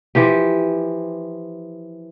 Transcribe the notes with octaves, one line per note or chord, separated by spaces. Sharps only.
E3 F3 G4